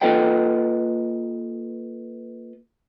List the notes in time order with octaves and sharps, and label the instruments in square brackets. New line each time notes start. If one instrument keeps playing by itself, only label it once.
[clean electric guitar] A#3 F4 A4 B4 D#5 G5